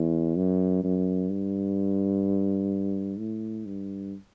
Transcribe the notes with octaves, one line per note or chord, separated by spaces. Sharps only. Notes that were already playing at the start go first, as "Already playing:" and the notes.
Already playing: E2
F#2
F#2
G2
A2
G2